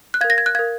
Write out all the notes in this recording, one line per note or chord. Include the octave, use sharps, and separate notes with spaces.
F#6
A#4 F5 G#6
A#6
G#6
F#6
A#4 F5 G#6